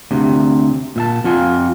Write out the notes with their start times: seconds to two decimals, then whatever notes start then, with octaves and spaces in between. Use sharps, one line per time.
0.11 D2 C3
0.96 A#2 E5 A5
1.24 F2 F4 F#5 G#5